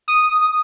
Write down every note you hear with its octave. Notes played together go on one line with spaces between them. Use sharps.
D#6